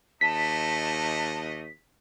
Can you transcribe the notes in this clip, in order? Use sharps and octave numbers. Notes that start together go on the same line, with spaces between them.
D#2 A3 D4 D#5 A5 B6